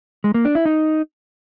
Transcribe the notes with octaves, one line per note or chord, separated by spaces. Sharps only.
G#3
A#3
D4
E4
D#4